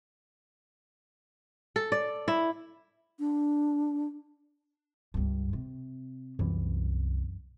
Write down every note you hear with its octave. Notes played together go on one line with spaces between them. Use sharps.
A4
D5
E4
D4
C#2 G2
C3
C2 F#2 E3